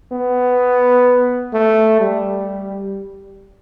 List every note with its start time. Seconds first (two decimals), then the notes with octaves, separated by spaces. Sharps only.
0.12 B3
1.53 A3
2.00 G3